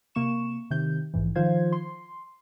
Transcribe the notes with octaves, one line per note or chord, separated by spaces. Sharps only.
C3 A#3 C#6 E7
C3 D#3 G6
A#1 G#2 E3
D#3 F3 F4 C5 F5 G#6
C6